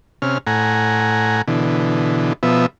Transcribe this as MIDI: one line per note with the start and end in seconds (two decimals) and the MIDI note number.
0.22 0.38 48
0.22 0.38 61
0.22 0.38 89
0.47 1.42 45
0.47 1.42 78
0.47 1.42 80
0.47 1.42 82
1.48 2.33 47
1.48 2.33 50
1.48 2.33 52
2.43 2.66 47
2.43 2.66 53
2.43 2.66 59
2.43 2.66 76